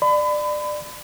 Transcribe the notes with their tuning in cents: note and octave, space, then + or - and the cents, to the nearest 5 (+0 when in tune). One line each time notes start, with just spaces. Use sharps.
D5 +20 B5 +35